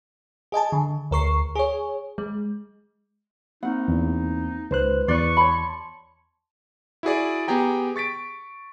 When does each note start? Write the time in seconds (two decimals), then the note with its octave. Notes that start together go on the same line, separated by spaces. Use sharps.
0.52 G#4 D#5 G#5 A5
0.72 D3
1.11 D2 A#4 C#6 C7
1.55 G#4 C#5
2.18 G#3
3.63 A#3 C4 D#4 F#5
3.88 E2
4.71 C#2 B4 C5 F#6
5.08 E2 B4 D5 C#6 D6
5.37 C#5 A5 B5 C6
7.03 E4 F#4 G#4 D5
7.48 B3 G4 G#4 G5 A#5
7.96 C#6 A6 B6 D7